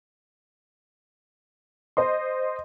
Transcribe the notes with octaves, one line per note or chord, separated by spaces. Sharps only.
C5 D#5 C6